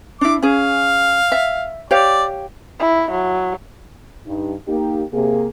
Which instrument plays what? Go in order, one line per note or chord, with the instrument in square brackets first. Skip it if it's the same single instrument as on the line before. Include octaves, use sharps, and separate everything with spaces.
[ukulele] D4 E4 [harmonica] D6
[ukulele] C#4 G#4 [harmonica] F5
[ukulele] E5
[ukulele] G4 C#5 F5 [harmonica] D5
[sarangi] E4
F#3
[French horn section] G2 D#4
A#3 D#4 G4
C3 A#3 G#4